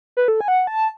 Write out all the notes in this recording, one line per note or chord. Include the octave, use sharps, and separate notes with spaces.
B4
A4
G#5
F#5
A5